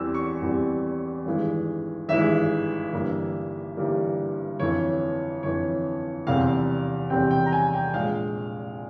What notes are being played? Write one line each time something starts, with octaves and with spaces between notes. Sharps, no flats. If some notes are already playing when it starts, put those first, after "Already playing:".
Already playing: E2 E3 G3 C4 E6
C#6
E2 E3 G3 C4
G#1 G2 E3 G#3
G#1 G2 E3 G#3 E5
G1 G2 E3 G3 A#3
G1 G2 E3 G3 A#3
G1 F2 E3 C#5
G1 F2 E3 C#5
F1 E2 C3 G3 C4 F5
F1 E2 C3 G3 C4 G5
G5
A#5
G#5
G5
A#1 A#2 G#3 F5